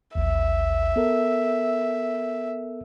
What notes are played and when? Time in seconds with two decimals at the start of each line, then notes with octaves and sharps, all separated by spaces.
0.15 A1 D#2 E5
0.96 B3 A4 A#4